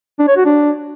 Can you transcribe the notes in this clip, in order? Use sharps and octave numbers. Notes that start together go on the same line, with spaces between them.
D4
C#5
F#4
D4